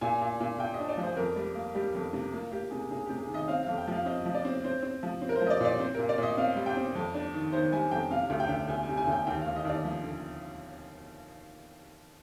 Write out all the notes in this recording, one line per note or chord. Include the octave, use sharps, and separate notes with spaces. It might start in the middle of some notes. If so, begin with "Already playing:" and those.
A#2 G#5
A#2
A#2
A#2 G5
D#5
D4
D5
F3
C5
F2 A#4
G3
A#3
G3 G4
F2
C3
A#3 F4
A#3 G4
C3 G#4
C3 G#4
G4
C3
G#4
D#3
D#5
C4 F5
F5
F2
G5
F3 F5
C4 D#5
F3
D5
C4
C4 C5
C4
F3
C4
A#4
C5
F3 D#5
D5
A#2 D5
C4 C5
A#4
A#2
D5
A#2 D#5
C4 F5
G3
G5
C4
F2
D4
D#3
D#3 C5
G3 G#5
F2 G5
C3 F5
D2
G5
D2
D2 G#5
G#5
C3
G#5
D2 G5
D#2 G5
F5
D#2
D#5
D#2 D5
F3
D3